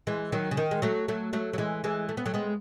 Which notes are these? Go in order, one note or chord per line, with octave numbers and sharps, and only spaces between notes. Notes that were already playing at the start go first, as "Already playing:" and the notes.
E3 G#3
D#3 F#3
C#3
D#3
G#3
F#3 A3
F#3 A3
F#3 A3
F#3
E3 G#3
E3 G#3
A3
B3
F#3 A3
G#3 B3